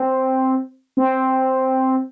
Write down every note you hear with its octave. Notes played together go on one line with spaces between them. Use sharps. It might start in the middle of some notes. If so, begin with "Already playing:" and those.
Already playing: C4
C4